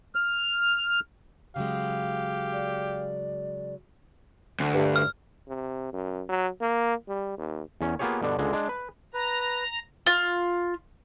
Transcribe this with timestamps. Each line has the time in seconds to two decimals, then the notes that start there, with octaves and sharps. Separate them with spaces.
0.15 F6
1.56 C#3 F#3 G#3 G4 F5
2.53 D5
4.60 D2
4.73 G2
4.96 F6
5.48 C3
5.93 F#2
6.29 F#3
6.61 A#3
7.08 G3
7.38 D#2
7.81 E2 C#4
7.99 A#3 B3 F4 G4 G#4 C#5
8.22 G2 B2 D3 D4
8.39 C#2 D3 G#3
8.53 G#3 D4
8.69 B4
9.14 B4 A#5
10.07 F4